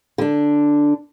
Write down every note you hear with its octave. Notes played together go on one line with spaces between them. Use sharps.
D3 D4